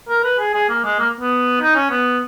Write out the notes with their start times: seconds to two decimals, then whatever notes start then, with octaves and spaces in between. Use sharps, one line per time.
0.09 A#4
0.23 B4
0.39 G#4
0.54 G#4
0.69 A#3
0.84 G#3
0.99 A#3
1.20 B3
1.61 D#4
1.75 C#4
1.91 B3